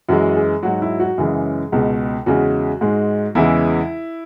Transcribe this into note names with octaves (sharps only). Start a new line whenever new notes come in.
F#2 E3 G#3 F#4
G#4
G#2 F#3 F#4
E4
F#4
F#2 C#3 E3 G#3 G#4
C#2 B2 G#3
E2 C#3 G#3 F#4
G#2 G#3
E2 C#3 E3 G#3 E4